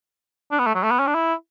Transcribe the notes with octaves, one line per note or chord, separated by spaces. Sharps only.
D4
B3
A3
F#3
A3
B3
C#4
D4
E4